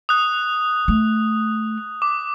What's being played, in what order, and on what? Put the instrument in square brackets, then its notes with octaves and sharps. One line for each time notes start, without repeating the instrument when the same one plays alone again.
[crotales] D#6 F#6
[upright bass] A3
[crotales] D6